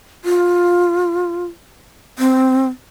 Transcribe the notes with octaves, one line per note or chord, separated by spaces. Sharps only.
F4
C4